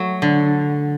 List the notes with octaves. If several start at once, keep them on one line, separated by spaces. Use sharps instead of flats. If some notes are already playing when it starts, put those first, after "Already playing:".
Already playing: F#3 A3
D3